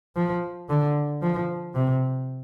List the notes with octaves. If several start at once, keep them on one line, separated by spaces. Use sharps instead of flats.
F3
D3
F3
C3